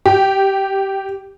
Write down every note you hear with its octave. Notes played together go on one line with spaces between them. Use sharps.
G4